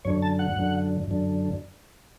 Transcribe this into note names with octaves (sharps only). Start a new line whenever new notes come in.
F#2 D3 C#5
A5
F#5
F#2 D3
F#2 D3